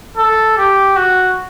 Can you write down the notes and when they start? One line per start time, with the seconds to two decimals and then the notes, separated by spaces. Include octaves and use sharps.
0.17 A4
0.57 G4
0.96 F#4